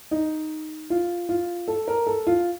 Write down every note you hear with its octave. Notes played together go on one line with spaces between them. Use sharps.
D#4
F4
F4
A4
A#4
A4
F4